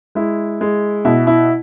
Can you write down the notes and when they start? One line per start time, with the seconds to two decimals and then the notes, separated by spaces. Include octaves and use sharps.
0.15 G#3 E4
0.61 G#3
1.05 B2 E4
1.27 E4